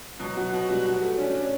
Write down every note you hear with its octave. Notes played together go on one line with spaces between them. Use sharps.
B2 F#3
F#4
B2
G3 F#4
F#4
A3
C#4 D4
D4